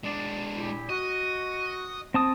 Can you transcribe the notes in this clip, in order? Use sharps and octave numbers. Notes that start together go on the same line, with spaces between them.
G#3 D4 D5
A#2 E4 G4
F#4 D#5
C4 A5 D#6